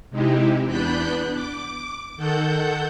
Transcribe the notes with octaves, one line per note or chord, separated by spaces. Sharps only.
C3 G#3 D#4 E4 G4
E2 B3 D4 B5 F#6 G6
D6
D#3 A4 F#5 G6